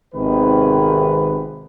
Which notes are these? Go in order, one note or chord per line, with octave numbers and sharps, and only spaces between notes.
G#1 C3 D#3 G#3 B3 B4